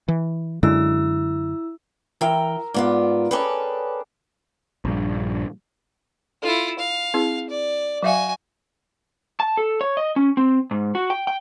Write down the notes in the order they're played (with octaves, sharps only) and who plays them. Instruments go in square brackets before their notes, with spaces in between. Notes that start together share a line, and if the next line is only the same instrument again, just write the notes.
[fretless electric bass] E3
[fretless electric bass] F#2 D3 G#3 [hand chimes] E4 E6
[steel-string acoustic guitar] E3 G5 [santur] A#4 A#5 E6
[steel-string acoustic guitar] G#2 B3 F4 [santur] D5
[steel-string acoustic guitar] C#4 A4 B4 [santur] G#4 G5 D6
[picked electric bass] A#1 G2
[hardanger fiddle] E4 F4 [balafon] A4
[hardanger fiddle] F5
[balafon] C4 E4 G#4
[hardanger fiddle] D5
[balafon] F#3 E5 F5 [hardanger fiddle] F#4 G#5
[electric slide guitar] A5
A4
C#5
D#5
C#4
C4
G#2
F#4
G5
G5